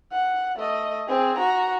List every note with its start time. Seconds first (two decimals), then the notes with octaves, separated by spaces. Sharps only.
0.12 F#5
0.56 A3 D#5
1.08 C4 G#4
1.38 F#4 A#5